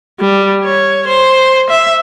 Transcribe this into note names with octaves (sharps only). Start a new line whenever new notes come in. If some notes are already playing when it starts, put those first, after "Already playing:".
G3
C#5
C5
E5